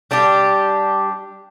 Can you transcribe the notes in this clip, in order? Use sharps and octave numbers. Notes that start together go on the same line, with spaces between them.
G3 D4 G4